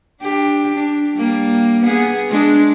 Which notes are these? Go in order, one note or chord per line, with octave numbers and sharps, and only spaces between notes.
D4 G4
D4
G3 A#3
B3 G#4
G#3 D4